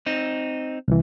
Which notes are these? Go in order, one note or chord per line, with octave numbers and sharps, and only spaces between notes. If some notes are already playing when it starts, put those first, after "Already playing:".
C4 D#4
C2 E3